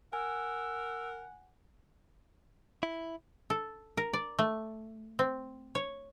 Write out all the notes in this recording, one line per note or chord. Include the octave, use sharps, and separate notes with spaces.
A#4 F#5 G#5 E6
E4
A4
A#4
D5
A3
C4
C#5